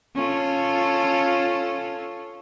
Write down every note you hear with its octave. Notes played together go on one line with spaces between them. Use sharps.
C#4 F4 A4